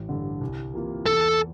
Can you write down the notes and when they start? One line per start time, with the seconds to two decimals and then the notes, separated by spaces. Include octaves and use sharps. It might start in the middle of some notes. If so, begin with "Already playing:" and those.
Already playing: A1
0.09 G2 D3
0.41 C2
0.74 C3 E3 A#3 F4
1.06 E2 A4